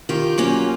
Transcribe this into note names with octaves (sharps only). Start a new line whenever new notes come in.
D#3 F4 G4
F#3 A#3 C#4